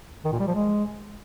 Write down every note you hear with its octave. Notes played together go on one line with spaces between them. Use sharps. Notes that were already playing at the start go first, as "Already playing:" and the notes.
D#3
A#2
G3
F3
G#3